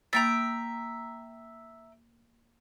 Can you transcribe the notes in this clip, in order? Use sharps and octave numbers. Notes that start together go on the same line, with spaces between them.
A#3 E5 G5 A#5 A6